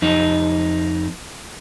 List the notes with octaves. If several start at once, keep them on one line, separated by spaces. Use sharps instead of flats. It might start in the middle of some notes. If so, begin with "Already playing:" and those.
F2 D#4